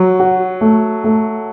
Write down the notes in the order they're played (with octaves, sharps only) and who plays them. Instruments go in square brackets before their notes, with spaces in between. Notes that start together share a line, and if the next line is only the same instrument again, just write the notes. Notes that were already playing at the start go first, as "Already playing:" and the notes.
Already playing: [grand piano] F#3
[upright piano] F#4
A3
A3